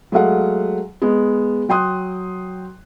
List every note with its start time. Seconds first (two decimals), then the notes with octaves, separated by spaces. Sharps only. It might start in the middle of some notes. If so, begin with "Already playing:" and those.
0.12 F#3 G#3 A3 F5 F#5
1.02 G#3 B3
1.69 F#3 G5 C6 D#6 F#6